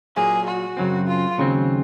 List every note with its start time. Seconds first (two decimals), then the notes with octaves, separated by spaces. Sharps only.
0.17 A#2 F#3 A#3 G#4
0.46 F#4
0.77 F#2 C#3 F#3 C4
1.07 F4
1.38 D#2 C#3 F#3 C4